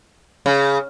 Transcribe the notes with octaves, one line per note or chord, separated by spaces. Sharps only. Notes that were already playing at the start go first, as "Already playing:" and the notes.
C#3